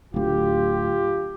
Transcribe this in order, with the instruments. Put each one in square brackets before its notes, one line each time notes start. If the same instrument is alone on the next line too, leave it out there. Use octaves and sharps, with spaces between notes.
[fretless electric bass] D1 D2 [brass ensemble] F4 G4